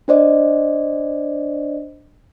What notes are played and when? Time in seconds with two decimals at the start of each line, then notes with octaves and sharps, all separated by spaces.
0.08 D4 C5 D5 D#5